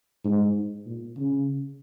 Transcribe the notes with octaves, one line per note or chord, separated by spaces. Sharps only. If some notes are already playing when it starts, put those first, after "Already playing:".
G#2
A#2
C#3